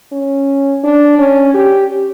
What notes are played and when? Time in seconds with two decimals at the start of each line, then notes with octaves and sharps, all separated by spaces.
0.12 C#4
0.83 D4
1.18 C#4
1.54 G4